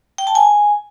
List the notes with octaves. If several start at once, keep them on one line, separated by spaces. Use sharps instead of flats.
G5
A5
G#5